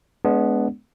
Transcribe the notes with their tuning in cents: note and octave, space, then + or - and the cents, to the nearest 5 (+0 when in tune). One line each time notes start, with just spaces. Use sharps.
G#3 +20 B3 +0 D4 -30